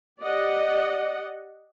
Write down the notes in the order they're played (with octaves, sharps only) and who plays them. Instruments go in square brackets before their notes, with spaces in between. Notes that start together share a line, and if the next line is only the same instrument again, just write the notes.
[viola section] G4 D5 D#5 F#5